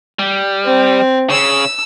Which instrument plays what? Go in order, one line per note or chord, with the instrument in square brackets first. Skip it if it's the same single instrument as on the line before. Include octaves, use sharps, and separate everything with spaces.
[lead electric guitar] G3
[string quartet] C4
[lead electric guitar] C#3 [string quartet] E6